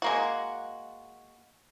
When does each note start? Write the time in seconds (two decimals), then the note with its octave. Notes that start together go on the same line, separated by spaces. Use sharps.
0.02 G#3 A#3 F#4